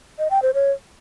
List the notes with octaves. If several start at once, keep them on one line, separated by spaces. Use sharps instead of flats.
D#5
G5
C5
C#5